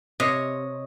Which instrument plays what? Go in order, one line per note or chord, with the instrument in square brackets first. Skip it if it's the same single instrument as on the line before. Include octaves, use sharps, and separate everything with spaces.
[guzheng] C3 [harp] C#5 D#5